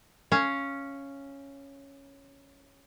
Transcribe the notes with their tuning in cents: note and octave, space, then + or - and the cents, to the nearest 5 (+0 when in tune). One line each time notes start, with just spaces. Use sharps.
C#4 +0 F5 -10